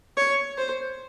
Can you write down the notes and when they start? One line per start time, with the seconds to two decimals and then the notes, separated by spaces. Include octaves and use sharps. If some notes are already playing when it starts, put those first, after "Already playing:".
0.17 C#5
0.58 C5